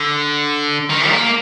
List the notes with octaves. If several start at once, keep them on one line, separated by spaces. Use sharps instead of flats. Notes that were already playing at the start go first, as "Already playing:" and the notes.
Already playing: D3
D#3
A#3